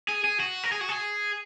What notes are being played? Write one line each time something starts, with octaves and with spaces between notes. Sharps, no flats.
G#4
G#4
F#4
A#4
G#4
F#4
G#4